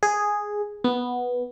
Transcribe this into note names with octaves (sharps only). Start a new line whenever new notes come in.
G#4
B3